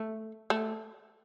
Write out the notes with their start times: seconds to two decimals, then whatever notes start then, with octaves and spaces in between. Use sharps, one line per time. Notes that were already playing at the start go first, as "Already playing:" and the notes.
Already playing: A3
0.50 A3